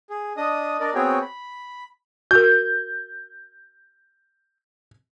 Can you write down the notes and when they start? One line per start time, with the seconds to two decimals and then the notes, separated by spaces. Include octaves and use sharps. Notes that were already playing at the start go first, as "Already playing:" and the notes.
0.10 G#4
0.37 D4 D#5 D#6
0.80 D4 A#4 D5 D#5
0.95 B3 C4 F#4 G#4 C#5 G5
1.22 B5
2.31 F#4 A#4 G6